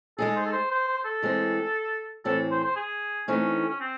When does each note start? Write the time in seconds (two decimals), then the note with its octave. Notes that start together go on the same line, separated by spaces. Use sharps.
0.18 G#3 D#4 G#4 A4
0.36 C5
0.46 A4
0.53 C5
0.71 C5
0.87 C5
0.98 C5
1.05 A4
1.22 E3 G#3 C4
2.25 A2 E3 C4 A4
2.51 C5
2.64 C5
2.76 G#4
3.28 E3 A3 C4 C#4 D#4
3.69 C#4
3.80 C4